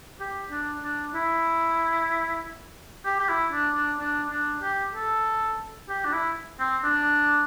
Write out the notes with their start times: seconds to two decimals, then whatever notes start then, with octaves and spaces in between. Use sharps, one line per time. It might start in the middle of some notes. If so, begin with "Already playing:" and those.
0.20 G4
0.51 D4
0.84 D4
1.14 E4
3.05 G4
3.20 G4
3.29 E4
3.52 D4
3.75 D4
4.00 D4
4.31 D4
4.62 G4
4.95 A4
5.89 G4
6.05 D4
6.13 E4
6.60 C4
6.84 D4